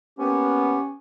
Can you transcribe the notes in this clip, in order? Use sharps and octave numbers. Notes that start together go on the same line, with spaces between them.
A#3 B3 C#4 G4